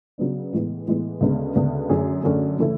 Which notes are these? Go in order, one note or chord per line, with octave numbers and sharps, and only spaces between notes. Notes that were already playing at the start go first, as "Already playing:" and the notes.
C#3 F#3 B3 D4
A2 E3 G#3 B3
A2 E3 G#3 B3
D2 C#3 G#3 B3 D4
D2 C#3 G#3 B3 D4
F#2 D3 A3 C#4 G#4
F#2 D3 A3 C#4 G#4
C#3 E3 A3 E4